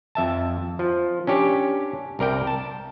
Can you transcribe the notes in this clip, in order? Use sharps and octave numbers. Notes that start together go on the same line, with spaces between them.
F2 E5 A5
F3
C#4 D4 G4 C#5
C2 A#4 D5 G5
A5